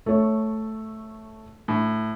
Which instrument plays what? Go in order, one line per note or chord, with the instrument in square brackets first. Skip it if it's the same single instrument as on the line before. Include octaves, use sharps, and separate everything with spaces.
[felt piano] A3 C#5
[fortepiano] A2